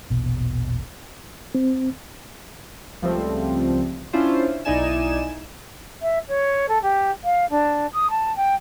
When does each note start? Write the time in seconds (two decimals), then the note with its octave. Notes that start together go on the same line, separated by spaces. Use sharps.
0.10 E1 A#1 B2
1.55 C4
3.02 C#2 F3 G3 A3 C4
4.13 C#4 D4 E4 F4 C5
4.65 B1 D#4 E4 D5 G#5 E7
6.01 E5
6.28 C#5
6.68 A4
6.82 G4
7.24 F5
7.49 D4
7.92 D#6
8.10 A5
8.36 G5